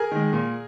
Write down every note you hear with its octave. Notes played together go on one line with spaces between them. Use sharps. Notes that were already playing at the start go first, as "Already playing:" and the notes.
Already playing: G#4 A#4
D#3 G#3
A#2